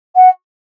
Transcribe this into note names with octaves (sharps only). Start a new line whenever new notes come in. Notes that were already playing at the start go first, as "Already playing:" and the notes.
F#5